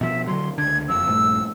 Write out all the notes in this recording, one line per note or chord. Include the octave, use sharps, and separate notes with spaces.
B2 F3 E5
D3 F#3 C6
C#2 D3 G#6
F#1 F2 E6
A#1 G2 A3